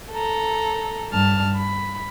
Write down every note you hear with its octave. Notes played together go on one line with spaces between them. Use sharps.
A4 A#5
G2 A5 F6
B5